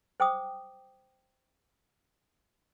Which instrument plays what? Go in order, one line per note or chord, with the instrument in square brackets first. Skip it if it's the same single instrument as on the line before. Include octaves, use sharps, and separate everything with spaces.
[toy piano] C5 G5 D6 D#6